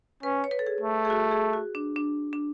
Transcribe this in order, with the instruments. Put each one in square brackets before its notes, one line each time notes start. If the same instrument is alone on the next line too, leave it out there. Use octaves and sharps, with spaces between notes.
[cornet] C#4 [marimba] B4
[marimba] C#5
B4
A4
G#4
[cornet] A3
[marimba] G#4
F#4
G#4
F#4
D4
D4
D4